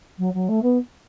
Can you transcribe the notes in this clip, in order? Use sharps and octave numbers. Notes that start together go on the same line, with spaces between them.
F#3
F#3
A3
B3